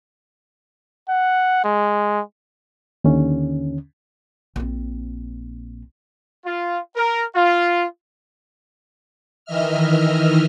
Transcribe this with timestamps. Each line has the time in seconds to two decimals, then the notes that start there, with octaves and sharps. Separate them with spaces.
1.09 F#5
1.64 G#3
3.04 D#2 D3 C#4
4.56 A#1 C4
6.45 F4
6.96 A#4
7.36 F4
9.45 D#3 E3 D#5 E5 F6